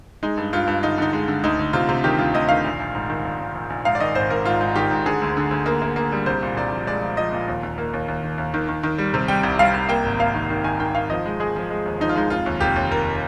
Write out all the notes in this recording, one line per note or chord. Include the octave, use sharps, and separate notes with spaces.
G#3 D#4
G2
G2 F4
G2
D3 D#4
D3 D#4
G#3
D3
D2 D#4
D2
C3 F4
C3
D#3 G4
D2 F4
D2 D#5
D#3 F5
A#1
A#1
G#2
D#3
A#1
A#1
A#1
A#1
G#2 F5
D5
D#3 D#5
G#1 C5
G#2 A#4
G#2 F4
G#2
D#3 G4
G#2
D3 G#4
D2
D3
D2
A#3
A#3
A#3
G3
C2 C5
A#2
C2 D5
F3
G#3 D5
F3
F3 D#5
A#2
D#2
D#2
A#3
D#2
D#2
D#3
D#2
D#3
D#3
D#3
G3
C3
G3 G5
C2
G3 F5
C2
A#3 G5
G#1
A#3 F5
D#3
D#3
D#3 G#5
D#3 G5
D#3 F5
F3 D#5
G#3
G#3 G#4
F3
G#3
D#2
F3 D#4
F4
G#3 D#4
F1 F4
D#2
F1 G4
D#2
F1 A#4